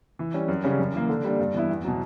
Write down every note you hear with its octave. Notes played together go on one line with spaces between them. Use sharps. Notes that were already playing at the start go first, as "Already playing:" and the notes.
E3
G3 C#4
F#2
C#3 G3 C#4
F#2
E3 A#3
D3
G3 A#3 D4
G2
E3 B3 E4
E2
B2 F#3